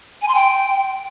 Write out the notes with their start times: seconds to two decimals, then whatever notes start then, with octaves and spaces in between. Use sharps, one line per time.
0.22 G#5
0.28 C6
0.35 G5